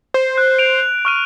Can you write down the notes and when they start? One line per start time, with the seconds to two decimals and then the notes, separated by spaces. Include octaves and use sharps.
0.14 C5
0.38 F#6
0.59 D7 F7
1.05 C#6 F6 D#7